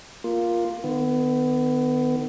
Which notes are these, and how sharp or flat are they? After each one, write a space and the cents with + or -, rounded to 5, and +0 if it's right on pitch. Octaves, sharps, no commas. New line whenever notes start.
A#3 +5 F4 +0
D#3 -35 B3 +25